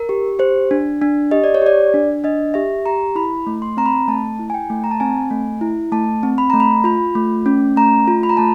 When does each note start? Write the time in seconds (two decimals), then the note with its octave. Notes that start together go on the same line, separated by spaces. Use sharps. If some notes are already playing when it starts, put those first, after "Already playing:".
Already playing: A#4
0.09 G4
0.39 G4 C5
0.71 D4
1.02 D4
1.31 G4 D#5
1.44 D5
1.54 C#5
1.62 G4 D5
1.94 D4
2.24 D4 D#5
2.54 G4 E5
2.86 G4 A#5
3.15 E4 B5
3.47 A3
3.62 C6
3.77 C4 A#5
3.86 B5
4.08 A3 A5
4.39 E4
4.50 G#5
4.54 G5
4.70 A3
4.84 A#5
4.91 A5
5.00 C4 G#5
5.30 A3
5.61 E4
5.92 A3 A5
6.23 C4
6.38 B5
6.50 A3 A#5
6.60 B5
6.84 F4 B5
7.15 A3
7.46 C#4
7.76 A3 A#5
8.08 F4
8.23 B5
8.29 A#5
8.37 A3 A5